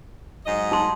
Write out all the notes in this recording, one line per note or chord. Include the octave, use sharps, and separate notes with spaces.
G#2 F#3 D#5
D#4 C6